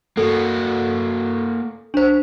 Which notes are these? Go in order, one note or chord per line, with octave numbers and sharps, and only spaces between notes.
A#3 F#4 A4
D4 C5